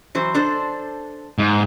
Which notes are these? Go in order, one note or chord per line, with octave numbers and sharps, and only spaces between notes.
E3 F#3 C5
D4 A4 C5
G#2